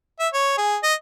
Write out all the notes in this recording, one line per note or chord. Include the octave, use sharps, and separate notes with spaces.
E5
C#5
G#4
D#5